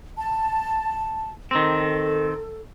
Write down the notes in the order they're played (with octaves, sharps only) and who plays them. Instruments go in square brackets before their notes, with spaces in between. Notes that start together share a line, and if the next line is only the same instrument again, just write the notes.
[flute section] A5
[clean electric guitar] D#3 C4 [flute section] A4